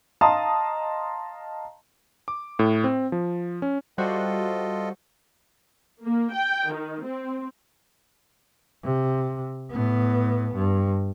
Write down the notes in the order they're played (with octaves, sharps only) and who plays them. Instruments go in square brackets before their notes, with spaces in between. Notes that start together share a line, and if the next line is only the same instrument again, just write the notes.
[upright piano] D#5 F5 A5 A#5 C6 D#6
[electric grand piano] D6
A2
C4
F3
C#4
[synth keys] G3 F#4 C5 [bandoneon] F4 A4 D#5
[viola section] A#3
G5
D#3
C4
[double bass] C3
A2 B3
G2